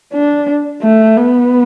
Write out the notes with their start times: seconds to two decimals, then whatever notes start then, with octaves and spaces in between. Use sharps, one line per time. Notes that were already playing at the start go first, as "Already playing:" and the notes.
0.13 D4
0.82 A3
1.17 B3